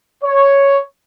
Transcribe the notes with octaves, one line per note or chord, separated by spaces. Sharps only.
C#5